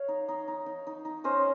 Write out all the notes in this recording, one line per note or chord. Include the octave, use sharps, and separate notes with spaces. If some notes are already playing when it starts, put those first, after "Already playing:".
Already playing: C#5 F5
D#4
D#4
D#4
D#4
D#4
D#4
C#4 C5 D#5